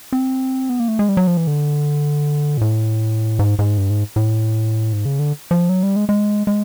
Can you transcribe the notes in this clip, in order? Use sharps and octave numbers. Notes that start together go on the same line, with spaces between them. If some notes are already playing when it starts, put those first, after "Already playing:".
C4
B3
A#3
A3
G#3
G3
F#3
F3
E3
D3
A#2
A2
G#2
G#2
G2
G#2
A2
G#2
C#3
D3
F3
F#3
G3
G#3
G#3
G#3